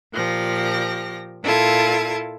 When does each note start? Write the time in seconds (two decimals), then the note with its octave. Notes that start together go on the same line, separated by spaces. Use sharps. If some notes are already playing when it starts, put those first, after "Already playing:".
0.13 A#2 F3 G4 A#6
1.43 A#2 E4 F4 A4 A5 G#6